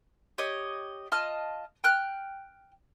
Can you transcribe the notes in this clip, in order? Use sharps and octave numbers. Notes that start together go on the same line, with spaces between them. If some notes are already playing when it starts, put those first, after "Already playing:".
G4 C#5 D#5
F4 D#5 A5 F6
G5 F6 F#6